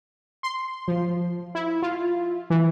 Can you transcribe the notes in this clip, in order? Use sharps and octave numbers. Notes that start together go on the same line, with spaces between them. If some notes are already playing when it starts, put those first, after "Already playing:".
C6
F3
E4
F4
E3